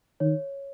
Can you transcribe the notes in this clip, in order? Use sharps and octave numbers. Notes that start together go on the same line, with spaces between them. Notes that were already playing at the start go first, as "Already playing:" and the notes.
D#3 C#5